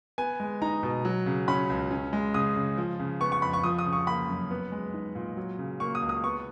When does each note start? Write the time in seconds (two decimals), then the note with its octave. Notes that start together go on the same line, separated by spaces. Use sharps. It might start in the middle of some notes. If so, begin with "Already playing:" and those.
0.18 B3 G#5
0.40 G#3
0.62 D#4 A#5
0.83 B2
1.05 F#3
1.26 C#3
1.48 C#4 B5
1.70 C#2
1.91 C#4
2.13 G#3
2.34 C#3 D#6
2.56 C#3
2.78 F3
2.99 C#3
3.21 B3 C#6
3.32 C#6
3.42 F2 B5
3.53 C#6
3.64 F3 D#6
3.79 D#6
3.86 C#3
3.93 C#6
4.07 A#3 B5
4.29 F#2
4.51 B3
4.72 G#3
4.94 D#4
5.15 A#2
5.37 F#3
5.58 C#3
5.80 A#3 C#6
5.95 D#6
6.02 C#2
6.09 D#6
6.24 B3 C#6